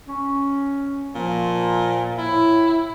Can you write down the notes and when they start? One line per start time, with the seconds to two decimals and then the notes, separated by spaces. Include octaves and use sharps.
0.08 C#4
1.15 A#2 F3
2.18 A2 E4